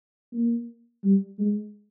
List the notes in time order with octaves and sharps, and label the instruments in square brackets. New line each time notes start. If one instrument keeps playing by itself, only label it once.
[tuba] A#3
G3
G#3